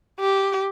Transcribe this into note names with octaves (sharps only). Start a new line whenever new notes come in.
G4